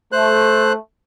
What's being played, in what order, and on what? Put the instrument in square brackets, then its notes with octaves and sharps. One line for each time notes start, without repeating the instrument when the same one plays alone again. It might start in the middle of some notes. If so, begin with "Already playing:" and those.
[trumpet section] A3 [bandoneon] C5 F#6